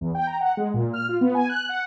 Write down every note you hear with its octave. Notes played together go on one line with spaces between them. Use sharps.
E2
G5
A#5
F#5
G#3
A#2
F6
F4
B3
G#5
F#6
F#5